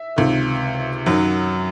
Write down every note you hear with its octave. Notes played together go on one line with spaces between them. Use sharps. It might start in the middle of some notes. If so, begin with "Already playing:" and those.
Already playing: E5
C#2 C3 D#3
F#2 D#3 F#3